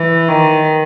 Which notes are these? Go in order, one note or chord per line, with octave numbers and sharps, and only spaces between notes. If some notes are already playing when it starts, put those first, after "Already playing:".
Already playing: E3
D#3